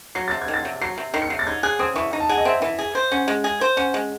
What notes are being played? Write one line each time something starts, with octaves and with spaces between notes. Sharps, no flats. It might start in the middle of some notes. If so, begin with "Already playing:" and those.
F#3 C7
C3 A6
G#6
D#3
A6
C3
F#3 C7
C3
D#3 C7
C#7
C3 C7
A6
D#4 G#6
G#4 F#6
C4 D#6
E3 C#6
D#4
A5
G#4 F#5
D#5
C4 E5
E3
G#4
C5
C#4 F#5
G#3
G#4
C5
C#4 F#5
G#3